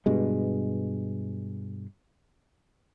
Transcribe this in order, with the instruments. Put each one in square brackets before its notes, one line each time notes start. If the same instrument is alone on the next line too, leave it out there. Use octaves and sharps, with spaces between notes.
[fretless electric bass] G2 B2 G#3